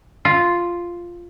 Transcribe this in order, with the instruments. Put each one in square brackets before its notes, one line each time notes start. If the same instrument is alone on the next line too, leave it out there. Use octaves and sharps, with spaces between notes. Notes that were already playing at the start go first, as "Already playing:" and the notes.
[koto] F4